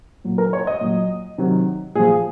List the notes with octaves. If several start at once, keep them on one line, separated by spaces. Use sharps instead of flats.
A#2 F#3
A#4
C#5
D#5
A#2 F#3
C3 D#3 F#3
A#2 F3 G#4